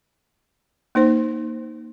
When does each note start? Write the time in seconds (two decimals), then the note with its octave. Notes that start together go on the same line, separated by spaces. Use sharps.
0.95 A#3 D#4 C5